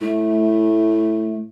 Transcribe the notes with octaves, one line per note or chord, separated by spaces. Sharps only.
A2 A3